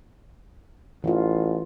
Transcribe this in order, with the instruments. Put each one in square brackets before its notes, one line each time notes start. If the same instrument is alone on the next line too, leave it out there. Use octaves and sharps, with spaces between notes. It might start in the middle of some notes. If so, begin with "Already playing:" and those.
[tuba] A1 [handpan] E3 F4